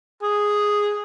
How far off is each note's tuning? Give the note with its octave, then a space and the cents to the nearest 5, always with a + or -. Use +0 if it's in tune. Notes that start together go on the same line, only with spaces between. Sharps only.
G#4 -5